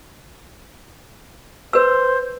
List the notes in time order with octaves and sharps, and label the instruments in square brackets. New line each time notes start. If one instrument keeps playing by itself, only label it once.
[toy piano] B4 E6 [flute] C5